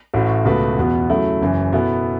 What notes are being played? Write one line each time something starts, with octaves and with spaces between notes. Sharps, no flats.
A1 A2 A3 F#4
C#2 B2 A3 F#4 B4
E2 B2 B3
C#3 F#3 A3 E4
F#1 F#2 E3
B2 B3 E4 A4